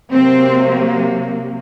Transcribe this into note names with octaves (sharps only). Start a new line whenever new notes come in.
C3 F#3 A#3 C4